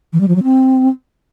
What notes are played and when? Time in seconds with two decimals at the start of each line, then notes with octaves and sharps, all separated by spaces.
0.13 E3
0.21 G3
0.28 F3
0.36 F#3
0.43 C4